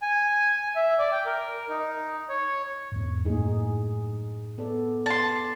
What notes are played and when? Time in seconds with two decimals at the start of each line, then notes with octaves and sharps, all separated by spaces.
0.02 G#5
0.76 E5
0.99 D5
1.12 G5
1.26 A#4
1.69 D#4
2.29 C#5
2.92 E2 G#2
3.25 F#2 A2 A#3 D#4 G#4
4.58 B3 A4 D5
5.06 D5 A5 C6